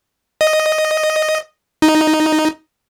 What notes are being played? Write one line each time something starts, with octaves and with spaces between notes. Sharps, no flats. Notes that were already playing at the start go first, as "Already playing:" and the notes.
D#5
D#4